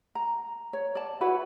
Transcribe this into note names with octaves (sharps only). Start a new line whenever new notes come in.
A#5
C#5
D5 A5
E4 F#4 B4 F#5